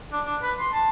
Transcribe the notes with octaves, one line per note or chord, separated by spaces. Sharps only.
D4
D4
B4
C6
A5